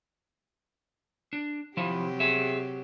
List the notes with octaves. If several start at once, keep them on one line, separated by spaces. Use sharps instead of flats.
D4
C3 F3 F#3 E4 G4
G#4 E5